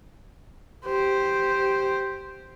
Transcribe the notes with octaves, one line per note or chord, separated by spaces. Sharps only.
G4 C5